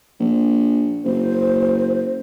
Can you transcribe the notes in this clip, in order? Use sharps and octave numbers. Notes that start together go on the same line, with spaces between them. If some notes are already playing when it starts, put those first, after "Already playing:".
A#1
F#1 C5